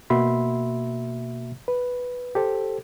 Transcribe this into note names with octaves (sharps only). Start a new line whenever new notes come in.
B2 A#3 F#4 E5 B5 C6
B4
G4 A4 C5